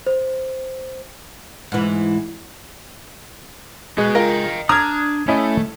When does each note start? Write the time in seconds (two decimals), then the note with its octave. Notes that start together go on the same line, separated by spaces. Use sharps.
0.07 C5
1.72 G#2 E3
3.98 G#3 F#4 B4
4.15 F4 A#4 D#5 G5
4.69 D4 A#5 D#6 F6 G#6
5.28 A3 C#4 E4 D#5